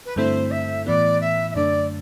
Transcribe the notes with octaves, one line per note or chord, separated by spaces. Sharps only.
B4
G2 D3 A3 C4 E4 C5
E5
A2 E3 B3 E4 D5
E5
E5
F#2 D3 A3 D4 D5